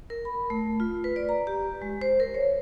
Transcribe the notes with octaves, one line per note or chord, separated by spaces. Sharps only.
A#4
B5
A3
F4
B4
D5
A#5
G4
G#3
C5
A#4
C#5